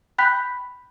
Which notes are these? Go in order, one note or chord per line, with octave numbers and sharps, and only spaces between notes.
G5 B5 F#6 G6 B6